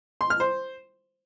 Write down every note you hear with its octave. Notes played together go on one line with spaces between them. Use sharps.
C6
F6
C5